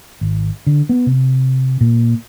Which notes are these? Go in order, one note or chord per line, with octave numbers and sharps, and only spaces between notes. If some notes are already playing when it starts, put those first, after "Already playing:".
G#1
D3
B3
C3
A#2